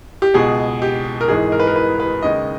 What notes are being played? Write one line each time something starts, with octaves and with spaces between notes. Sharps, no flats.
G4
C#2 B2 G#3 G#4
G4
A#4
G#1 G#2 E3 G#4
A#4
B4
A#4
B4
B4
D#2 C#3 G#3 D#5